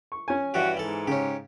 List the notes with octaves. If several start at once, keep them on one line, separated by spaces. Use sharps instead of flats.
C#6
C#4 G#5
G2 E3 F#4 G4
G#2 E3 A4
C#3 C#4 G4